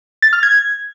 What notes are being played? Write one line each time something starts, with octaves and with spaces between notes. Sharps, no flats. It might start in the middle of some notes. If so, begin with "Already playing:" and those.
A6
F6
G#6